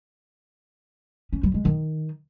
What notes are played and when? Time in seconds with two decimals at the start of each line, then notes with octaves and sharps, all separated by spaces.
1.33 C#4
1.43 G3
1.54 G#3
1.65 D#3